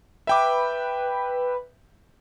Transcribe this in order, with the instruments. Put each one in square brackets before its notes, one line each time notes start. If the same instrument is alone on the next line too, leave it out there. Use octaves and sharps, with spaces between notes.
[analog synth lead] B4 [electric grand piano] E5 G5 D6